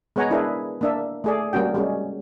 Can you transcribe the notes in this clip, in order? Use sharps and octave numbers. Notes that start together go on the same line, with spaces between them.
G#3 B3 C#5 F#5 G#5 A#5
D4 E4 G#4 A#4 B4
A#3 D4 E5
A3 G#4 D5
G3 A#3 C#4 F#4 G5
G3 G#3 C#4